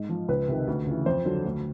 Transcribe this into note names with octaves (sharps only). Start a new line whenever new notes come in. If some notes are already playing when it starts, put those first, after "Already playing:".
Already playing: G#2
F3
C#2 B4
C3 D#3
D2
C#3 E3
F2 C5
D3 F#3
D2